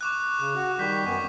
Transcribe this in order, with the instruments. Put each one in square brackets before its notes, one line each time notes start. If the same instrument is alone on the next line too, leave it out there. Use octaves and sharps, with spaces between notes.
[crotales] C#6 D6 F#6
[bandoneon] C#3 [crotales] F#6
[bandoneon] F#4
[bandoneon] D#3 G3 G6 [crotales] C#6 B6
[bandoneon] F#2 B3 G#5